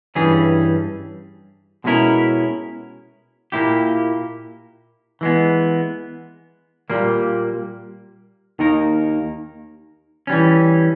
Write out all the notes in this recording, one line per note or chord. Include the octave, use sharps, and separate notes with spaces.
G2 E3 G3 C#4 G#4
B2 G#3 C#4 E4 A#4
A#2 A#3 E4 G4
E3 G#3 B3
A#2 G3 A#3
D#2 D#3 A#3 D#4 A#4
E3 G3 C#4